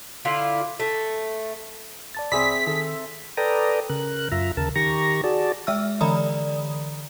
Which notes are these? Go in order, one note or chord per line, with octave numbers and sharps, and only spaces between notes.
D3 E4 F4
A3
D5 A5 A6
C2 C4 G#4 D5 E5 B5 B6
D#3 A4
A4 B4 D5 G5 A#5 D#6
C#3 A#4 F#6
F#2 F4 E5 A#5
D#2 C#3 A#4 A5
D#3 G4 A#5 C#6 A#6
F#4 G#4 D5 A5
G#3 E5 E6 F6
D3 E3 D5 A#5 B5 D#6